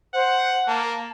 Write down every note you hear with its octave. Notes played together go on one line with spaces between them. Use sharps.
C5 F#5
A#3 A5